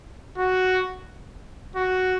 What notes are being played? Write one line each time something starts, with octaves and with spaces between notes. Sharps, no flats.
F#4
F#4